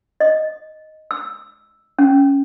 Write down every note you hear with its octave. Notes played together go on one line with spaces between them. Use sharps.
D#5
E6
C#4